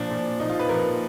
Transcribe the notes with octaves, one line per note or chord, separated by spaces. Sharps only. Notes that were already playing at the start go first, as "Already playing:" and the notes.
Already playing: A#2 F3 D4
A#2 F3
A#2 F3 D#4
F4
B4
A#2 F3 A#4